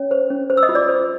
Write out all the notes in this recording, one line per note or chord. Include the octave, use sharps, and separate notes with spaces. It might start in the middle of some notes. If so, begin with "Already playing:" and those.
Already playing: C#4 C#5
C5
C#4
C5
E6
D#5 D#6
F4
D5 D6
C5